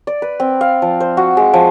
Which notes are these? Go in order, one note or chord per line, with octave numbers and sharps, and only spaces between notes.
D5
B4
C4
F5
F3
C5
F#4
G#3
F3